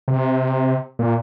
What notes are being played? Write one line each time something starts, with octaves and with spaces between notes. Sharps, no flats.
C3
A#2